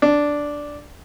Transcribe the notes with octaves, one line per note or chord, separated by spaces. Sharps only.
D4